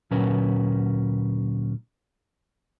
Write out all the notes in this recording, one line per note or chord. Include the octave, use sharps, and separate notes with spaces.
D2 A#2 F#3 C#4 A#4 B4